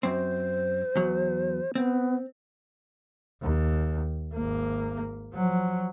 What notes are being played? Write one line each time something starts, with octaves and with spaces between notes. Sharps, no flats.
F#2 C4 C5
E2 F#3
B3 C4
D#2
G#1 A#3
F3 F#3